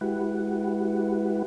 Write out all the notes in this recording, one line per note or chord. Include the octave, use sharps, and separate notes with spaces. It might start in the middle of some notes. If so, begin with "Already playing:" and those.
G#3 E4 F#4 G4 B4 F#5